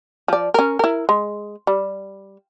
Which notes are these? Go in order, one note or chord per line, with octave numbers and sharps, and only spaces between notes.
F3 D5
C#4 A#4
E4 A#4
G#3
G3